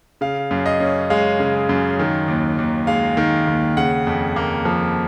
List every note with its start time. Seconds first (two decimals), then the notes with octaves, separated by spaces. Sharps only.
0.21 C#3 F5
0.51 F#2
0.66 D#5
0.80 C#4
1.10 G#3 F5
1.40 C#3
1.69 F#2
1.99 D#3
2.28 D#2
2.58 D#2
2.87 G#3 F5
3.17 D#3
3.47 D#2
3.77 C#3 F#5
4.07 F2
4.36 A#3
4.65 F3